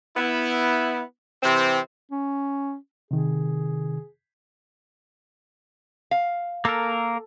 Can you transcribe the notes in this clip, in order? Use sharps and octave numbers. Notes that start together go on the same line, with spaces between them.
B3 E4
C3 E3 C4
C#4
C3 D#3 G#4
F5
A#3 A4 A#4